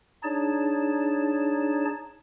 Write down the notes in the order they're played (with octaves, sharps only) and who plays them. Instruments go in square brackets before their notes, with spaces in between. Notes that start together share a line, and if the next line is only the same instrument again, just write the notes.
[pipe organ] D4 D#4 G#4 C#5 D5 A5